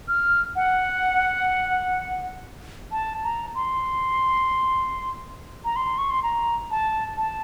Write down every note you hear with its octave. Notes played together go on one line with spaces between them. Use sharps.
F6
F#5
A5
A#5
C6
A#5
C6
C#6
C6
A#5
A5
A5